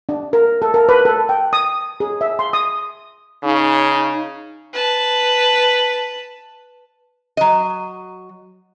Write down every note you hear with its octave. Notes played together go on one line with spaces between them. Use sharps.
D4
A#4
A4
A#4
B4
A4
G5
D#6
G#4
E5
C6
D#6
C#3 D#4
B4 A5
F#3 D#5